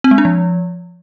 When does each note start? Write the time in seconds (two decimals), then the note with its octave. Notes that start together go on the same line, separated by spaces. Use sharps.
0.04 C4
0.11 G#3
0.18 D4
0.25 F3